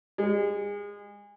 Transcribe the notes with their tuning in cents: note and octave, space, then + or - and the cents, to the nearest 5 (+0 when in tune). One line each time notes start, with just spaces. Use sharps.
G#3 -30